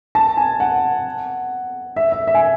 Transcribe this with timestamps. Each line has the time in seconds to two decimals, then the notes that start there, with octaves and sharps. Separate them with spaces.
0.15 A5
0.37 G#5
0.60 F#5
1.96 E5
2.12 E5
2.27 E5
2.34 G#5